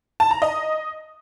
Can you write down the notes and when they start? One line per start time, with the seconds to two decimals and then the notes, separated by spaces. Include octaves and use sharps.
0.20 A5
0.31 A#5
0.42 D#5